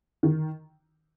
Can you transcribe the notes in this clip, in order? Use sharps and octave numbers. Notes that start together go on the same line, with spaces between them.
D#3